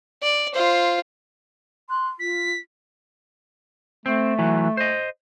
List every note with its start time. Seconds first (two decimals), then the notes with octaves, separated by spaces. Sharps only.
0.23 D5
0.55 F4 C5
1.90 C6 F#6
2.19 F4 B6
4.06 A3 C4
4.39 E3 F#3
4.77 C5 D#5